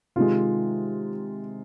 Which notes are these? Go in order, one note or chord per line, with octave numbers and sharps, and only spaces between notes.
C3 D#3 G#3 F4